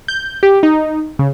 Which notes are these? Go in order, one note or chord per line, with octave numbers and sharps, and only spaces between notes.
G6
G4
D#4
C#3